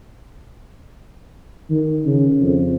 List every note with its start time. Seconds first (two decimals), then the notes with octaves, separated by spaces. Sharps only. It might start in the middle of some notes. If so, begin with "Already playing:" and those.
1.70 D#3
2.05 C#3
2.41 F2